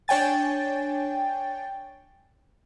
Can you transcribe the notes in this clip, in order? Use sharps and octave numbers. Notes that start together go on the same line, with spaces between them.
D4 C#5 G5 G#5 A6